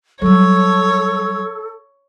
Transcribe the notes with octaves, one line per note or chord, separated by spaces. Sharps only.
F#3 G3 A4 C#5